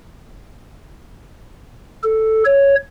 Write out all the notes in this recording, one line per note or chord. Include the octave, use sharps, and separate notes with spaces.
A4
C#5